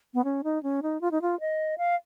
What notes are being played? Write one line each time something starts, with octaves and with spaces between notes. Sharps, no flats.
B3
C#4
D#4
C#4
D#4
F4
D#4
F4
D#5
F5